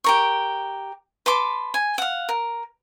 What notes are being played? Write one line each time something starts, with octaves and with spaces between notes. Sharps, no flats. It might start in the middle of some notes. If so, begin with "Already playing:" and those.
G4 A#4 C#6
B4 A5 C6 D6
G#5
F5 F#5
A#4